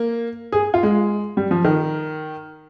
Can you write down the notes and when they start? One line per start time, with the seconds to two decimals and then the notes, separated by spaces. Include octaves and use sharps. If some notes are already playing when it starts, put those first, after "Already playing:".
Already playing: A#3
0.52 G#4
0.74 F4
0.83 G#3
1.37 G3
1.51 F3
1.64 D#3